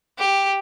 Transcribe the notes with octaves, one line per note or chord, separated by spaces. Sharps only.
G4